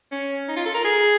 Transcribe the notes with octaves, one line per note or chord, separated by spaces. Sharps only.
C#4
D#4
F4
A4
A#4
G#4